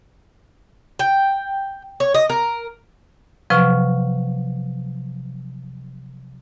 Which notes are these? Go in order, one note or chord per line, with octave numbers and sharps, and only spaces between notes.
G5
C#5
D#5
A#4
C3 F3 F#3 B4 C#6 F6